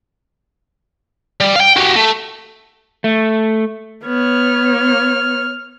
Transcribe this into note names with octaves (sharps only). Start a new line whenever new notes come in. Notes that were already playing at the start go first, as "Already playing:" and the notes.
G3
F5 G5
F#4 G4
A3
A3
B3 C#5 F6